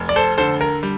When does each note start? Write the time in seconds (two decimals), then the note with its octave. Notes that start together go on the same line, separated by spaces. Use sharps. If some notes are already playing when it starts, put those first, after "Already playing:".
Already playing: F1
0.09 D5
0.16 A4 C5
0.38 D3 A4 C5
0.61 A#4
0.83 G3